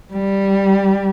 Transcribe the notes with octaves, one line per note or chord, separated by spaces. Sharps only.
G3